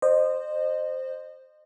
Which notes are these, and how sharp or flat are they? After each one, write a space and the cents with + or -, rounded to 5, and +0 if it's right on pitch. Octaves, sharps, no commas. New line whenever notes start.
C5 +0 D#5 -30